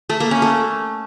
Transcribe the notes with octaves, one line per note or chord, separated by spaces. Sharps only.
A3
A#3
C#4
A3